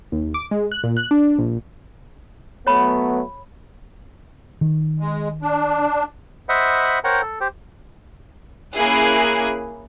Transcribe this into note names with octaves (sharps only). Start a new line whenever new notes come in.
D#2
D6
G#3
F#6
A#2
F#6
D4
A#1
F#3 A3 B3 C#5 B5
D#3
G#3
D4
C5 D#5 E5 F#5 B5
A#4 C5 C#5 F#5 G5 A#5
A4
G4 C5 G5
A#3 C#4 E4 G#4 F#6